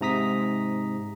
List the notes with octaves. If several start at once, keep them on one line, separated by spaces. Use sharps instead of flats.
G#2 C3 A#5 D#6 B6